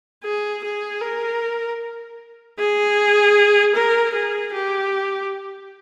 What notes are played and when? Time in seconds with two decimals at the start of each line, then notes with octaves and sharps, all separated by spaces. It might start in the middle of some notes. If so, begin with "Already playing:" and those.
0.23 G#4
0.63 G#4
1.01 A#4
2.58 G#4
3.75 A#4
4.14 G#4
4.53 G4